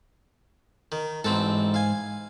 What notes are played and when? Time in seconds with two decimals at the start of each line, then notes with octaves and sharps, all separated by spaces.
0.92 D#3
1.24 A1 G#2 C4 A4
1.74 F5 G#5